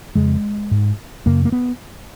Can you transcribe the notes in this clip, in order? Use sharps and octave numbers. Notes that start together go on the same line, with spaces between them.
F2 C#3 G#3
G#2
F#2 C#3 A#3
A#3
B3